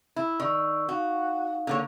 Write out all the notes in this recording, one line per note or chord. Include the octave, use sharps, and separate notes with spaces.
E4
D#3 D5 C#6 E6
D#4 F#4 F5
D3 A#3 C#5